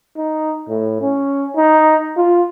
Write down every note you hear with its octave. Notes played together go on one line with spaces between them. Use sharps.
D#4
A2
C#4
D#4
F4